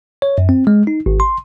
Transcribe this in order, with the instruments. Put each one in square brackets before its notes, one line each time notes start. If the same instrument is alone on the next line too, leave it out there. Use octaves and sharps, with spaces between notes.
[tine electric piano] C#5
F#2
C4
G#3
D#4
G#1
C6